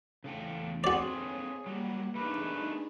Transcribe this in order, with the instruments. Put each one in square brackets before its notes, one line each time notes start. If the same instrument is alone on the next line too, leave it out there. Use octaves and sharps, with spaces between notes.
[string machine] E2 A3 [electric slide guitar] C#3 A4 G5
[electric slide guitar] C4 A4 B4 [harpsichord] F#4 D5 [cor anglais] G#4 [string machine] C#5
[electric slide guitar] F#3 G3 [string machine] A#3 F#5
[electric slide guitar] A3 G4 A#4 [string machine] D4 D#4 G#4 [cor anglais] B4